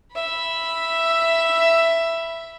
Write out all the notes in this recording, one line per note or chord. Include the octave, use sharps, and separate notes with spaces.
E5 B5